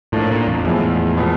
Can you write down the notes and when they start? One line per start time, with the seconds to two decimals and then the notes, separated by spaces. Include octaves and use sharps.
0.13 A2 F3 A#3 D4
0.31 A#2
0.48 F2
0.64 E2 A2 F3 G#3
1.17 A#2 F3 G#3 B3